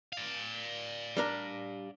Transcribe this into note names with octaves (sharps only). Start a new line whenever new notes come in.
D5 F5
G3 D4 A#4